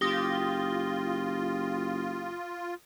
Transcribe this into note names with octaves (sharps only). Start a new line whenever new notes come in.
F#1 F4 G4 D#6 A#6 G7